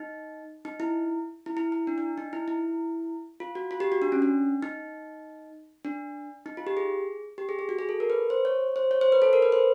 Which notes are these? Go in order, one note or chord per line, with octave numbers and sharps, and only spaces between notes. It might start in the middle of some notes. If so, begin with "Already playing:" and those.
Already playing: D#4
D#4
E4
E4
E4
E4
D4
D4
D#4
E4
E4
F4
F#4
F4
G4
F#4
D4
C#4
D4
D#4
D4
D#4
F4
G4
G#4
G4
G#4
G#4
F#4
G#4
A4
A#4
B4
C5
C#5
C5
C#5
C5
B4
A4
A#4
B4
C5